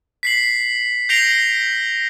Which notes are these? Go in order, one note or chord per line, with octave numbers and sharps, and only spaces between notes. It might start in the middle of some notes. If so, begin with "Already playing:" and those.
B6 C7 F#7
G6 A#6 C7 D7 F7 G7